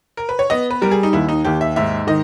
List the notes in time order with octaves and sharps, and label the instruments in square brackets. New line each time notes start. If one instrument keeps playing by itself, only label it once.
[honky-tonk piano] A#4
B4
C#5
[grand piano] B3 [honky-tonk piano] D#5
[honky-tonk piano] B4
[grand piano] G3 [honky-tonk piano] A#4
[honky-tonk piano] G#4
D#4
[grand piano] D#2 [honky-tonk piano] E4
[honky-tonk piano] D#4
[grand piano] D#2 [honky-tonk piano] G4
[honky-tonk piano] E5
[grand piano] G#2 [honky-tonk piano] E5
[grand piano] D#3 [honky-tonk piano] D#5